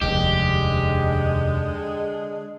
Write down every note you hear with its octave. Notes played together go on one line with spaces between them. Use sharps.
F1 D#2 D3 G#3 G4